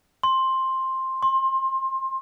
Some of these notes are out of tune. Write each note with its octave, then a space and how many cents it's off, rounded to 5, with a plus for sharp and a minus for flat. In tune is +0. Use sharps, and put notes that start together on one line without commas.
C6 +10
C6 +25